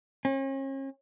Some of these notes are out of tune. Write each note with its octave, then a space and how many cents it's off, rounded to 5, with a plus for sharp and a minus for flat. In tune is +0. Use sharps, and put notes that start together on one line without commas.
C#4 -40